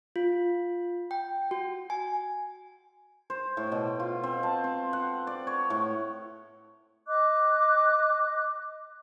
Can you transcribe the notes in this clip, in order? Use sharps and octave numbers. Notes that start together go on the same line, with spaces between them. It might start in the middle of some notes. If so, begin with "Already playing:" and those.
F4
G5
F#4
G#5
C5
A2
B2
F4
C4
A5
C4
F#5
D5
C#5
A2
D#5 D6 F#6